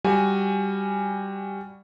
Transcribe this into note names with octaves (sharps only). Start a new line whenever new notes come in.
G3 F#4 G#5